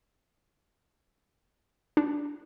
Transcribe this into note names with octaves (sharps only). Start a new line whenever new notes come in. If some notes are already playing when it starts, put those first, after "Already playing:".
D4